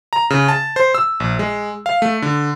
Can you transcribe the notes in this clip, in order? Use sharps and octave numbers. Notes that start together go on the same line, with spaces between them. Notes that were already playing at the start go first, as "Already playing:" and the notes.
A#5
C#3
A5
C5
E6
A#1
G#3
F5
A3
D3